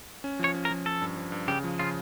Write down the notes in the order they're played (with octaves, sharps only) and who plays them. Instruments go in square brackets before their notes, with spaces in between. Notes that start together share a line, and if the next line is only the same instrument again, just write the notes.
[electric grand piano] C#4
[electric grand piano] F3 [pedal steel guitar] C#5
[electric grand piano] C#4
[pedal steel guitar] A#4
[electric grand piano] F3
[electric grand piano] C#4 [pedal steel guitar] A4
[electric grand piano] G2
F3
G2
[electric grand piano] C#3 [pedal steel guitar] G4
[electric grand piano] F3
[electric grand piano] C#3 [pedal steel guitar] F4